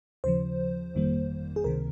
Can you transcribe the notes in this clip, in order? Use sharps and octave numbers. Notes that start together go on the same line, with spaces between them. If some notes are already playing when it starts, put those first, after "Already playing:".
D#2 C#3 F3 C5
G1 F2 D#3 G3 A#3
G#4
C#2 C3 D#3 A#4